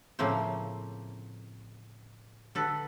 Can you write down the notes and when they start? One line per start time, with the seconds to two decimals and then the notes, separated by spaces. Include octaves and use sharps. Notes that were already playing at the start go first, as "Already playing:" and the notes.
0.19 A2 C#3 F3 A#3 C4 C5
2.55 D3 A4 B4